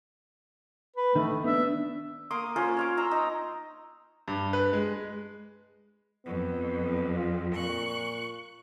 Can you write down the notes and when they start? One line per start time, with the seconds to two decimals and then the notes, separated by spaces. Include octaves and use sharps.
0.96 B4
1.15 D#3 A3 D#4
1.44 B3 D4 E5
2.31 A#3 C6 D6 D#6
2.56 A#3 C#4 F4 C5
2.77 C#5 F5 D6
2.97 C5 A#5 C6 E6
3.11 D#4
4.28 G2
4.53 B4
4.73 G#3
6.26 F2 B3
7.16 F4
7.56 A#2 C#6 F#6